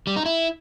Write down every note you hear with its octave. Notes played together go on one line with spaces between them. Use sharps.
G3
D#4
E4